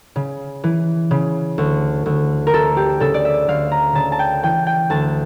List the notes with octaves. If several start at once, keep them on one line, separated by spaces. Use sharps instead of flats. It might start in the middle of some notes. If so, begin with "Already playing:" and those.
C#3
E3
C#3
D2
D2
A#4
D2 A4
G4
C#3 A4
D5
E5
D2 F5
A#5
C#3 A5
A5
G5
E3 G5
G5
D2 A5